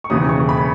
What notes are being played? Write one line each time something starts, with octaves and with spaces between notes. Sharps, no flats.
C#6
E1 D#2 C#3 E3 D#6
C#6
B5